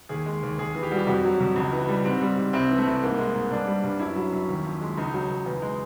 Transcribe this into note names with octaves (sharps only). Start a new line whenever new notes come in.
D#2 G#4
G#3
D#2
D#2 G#4
E3
G4
G3 F#4
G4
F2 F#4
F#3
F2
C#2
E3
G3
G#2 C4
G3
G#2
C2 C4
E3
A3
C2
G#2 A#3
G#3
G#2
G2 D4
G3
G2
F#2 E4
F#3
F#2
D#2
F3
G#3
C#2 D#4
F#3
C#2
E2
G#3